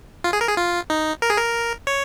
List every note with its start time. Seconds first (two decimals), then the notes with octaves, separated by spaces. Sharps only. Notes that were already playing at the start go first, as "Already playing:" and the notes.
0.24 F4
0.33 G#4
0.41 A#4
0.49 G#4
0.57 F4
0.90 D#4
1.22 A#4
1.30 G#4
1.38 A#4
1.87 C#5